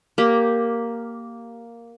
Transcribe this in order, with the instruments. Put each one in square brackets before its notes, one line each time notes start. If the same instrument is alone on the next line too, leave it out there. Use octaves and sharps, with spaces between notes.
[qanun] A#3 G4